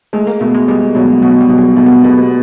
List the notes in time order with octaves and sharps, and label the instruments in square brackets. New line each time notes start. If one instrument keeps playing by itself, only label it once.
[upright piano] G#3 [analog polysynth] A3
[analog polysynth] A#3
[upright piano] B2 [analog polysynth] A3
[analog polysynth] G#3
[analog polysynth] G3 [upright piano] G#3
[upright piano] B2 [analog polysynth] F#3
[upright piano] B2 [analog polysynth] F#3
[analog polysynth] G3
[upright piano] B2
[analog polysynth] G#3
[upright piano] B2 [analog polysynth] A3
[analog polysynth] B3
A#3
[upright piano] B2 [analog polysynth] A#3
[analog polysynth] B3